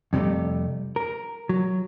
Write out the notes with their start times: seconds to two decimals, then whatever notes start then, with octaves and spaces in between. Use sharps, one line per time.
0.13 F2 C3 E3 G3 A3
0.96 A#4
1.49 F#3